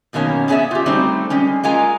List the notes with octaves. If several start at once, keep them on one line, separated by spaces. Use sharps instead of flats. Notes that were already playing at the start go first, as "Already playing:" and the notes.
F#2 B2 D#3 A#3 C#4
B3 C#4 G#4 D5 E5
F4 G4
G3 A3 C4 D#4 F#4
G3 G#3 C#4
G#3 A#3 F4 G#5 A#5